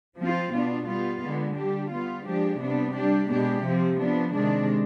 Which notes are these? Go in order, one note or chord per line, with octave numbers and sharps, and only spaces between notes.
F3 C4 F4
B2 B3 D4 F4
G3 B3 F4
D3 G#3 B3
G3 D4 G4
G3 B3 F4
F3 G#3 D4 G4
C3 G3 B3 D4
G3 D4 G4
B2 G#3 D4 G4
C3 F3 C4
F3 B3 D4
C3 D#3 G#3 D4